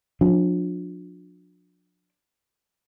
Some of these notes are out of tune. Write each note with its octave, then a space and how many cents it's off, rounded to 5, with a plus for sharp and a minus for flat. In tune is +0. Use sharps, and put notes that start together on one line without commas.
F3 +40 D4 +0